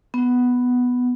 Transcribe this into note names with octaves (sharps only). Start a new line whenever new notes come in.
B3